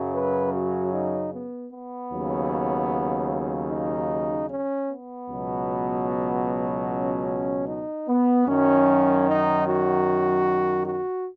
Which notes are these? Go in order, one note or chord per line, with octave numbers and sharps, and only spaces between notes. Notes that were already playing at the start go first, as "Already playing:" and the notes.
Already playing: F#2 C#3 F#3
B4
F#4
D#4
B3
B3
D#2 C#3 F#3
D#4
C#4
B3
C#2 B2 F#3
C#4
D#4
B3
F#2 D#3 F#3 C#4
D#4
F#4
F#4